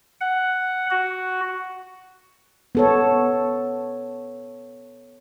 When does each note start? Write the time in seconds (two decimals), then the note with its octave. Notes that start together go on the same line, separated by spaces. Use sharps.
0.21 F#5
0.91 F#4
2.75 B3 A4 C#5